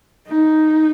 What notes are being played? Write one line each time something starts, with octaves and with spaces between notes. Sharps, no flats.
D#4